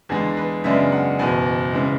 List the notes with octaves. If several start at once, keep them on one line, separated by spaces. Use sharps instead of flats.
E2 D3 G#3 G#4
B4
F#2 C#3 G#3 B3 D4 E5
F#5
F#1 E2 B2 G#5
C#3 E3 G#3